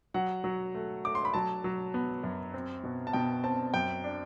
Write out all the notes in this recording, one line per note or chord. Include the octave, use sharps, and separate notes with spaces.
F#3 F#5
F#3
A3
A3 D6
C6
B5
F#3 A5
F#3
B3
F#2
C4
B2
A5
B2 G5
C4 A5
F#2 G5
D4